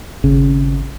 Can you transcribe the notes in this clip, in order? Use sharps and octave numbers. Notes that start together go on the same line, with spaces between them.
G#1 C#3